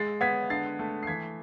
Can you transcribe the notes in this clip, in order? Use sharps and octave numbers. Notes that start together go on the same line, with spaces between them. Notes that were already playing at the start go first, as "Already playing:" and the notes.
Already playing: G#3 A6 C7
B3 G#6 B6
D3 A6 C7
A3
C7
E3 G#6 B6